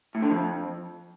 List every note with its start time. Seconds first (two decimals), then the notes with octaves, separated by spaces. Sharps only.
0.15 A2
0.22 D3
0.30 F2